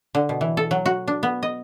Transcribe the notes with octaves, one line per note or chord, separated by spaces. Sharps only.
D3
B2
E3
A4
F#3
F#4
D4
B3
D#5